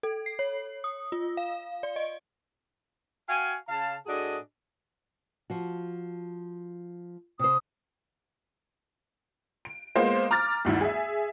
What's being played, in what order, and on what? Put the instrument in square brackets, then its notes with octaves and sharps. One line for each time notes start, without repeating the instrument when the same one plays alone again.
[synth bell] A4
C7
C#5
D#6
F4
F5
D5
D#5
[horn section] F#4 F5 G5 G#5
C#3 F5 A5
A2 D4 F#4 G#4 A4 D#5
[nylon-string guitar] F3 F#4
[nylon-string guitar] C3 C5 [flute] D#6
[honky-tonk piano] D7
G#3 A#3 B3 F4 C5
A#5 D6 F6 A6
G1 D2 D#3 E4
G#4 E5